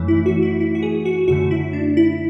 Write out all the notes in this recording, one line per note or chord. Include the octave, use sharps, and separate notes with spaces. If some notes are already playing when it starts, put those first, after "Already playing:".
Already playing: F#2 E3 A3
E4
F#4
E4
E4
F#4
G#4
F#4
F#2 D3 A3 F#4
E4
D4
E4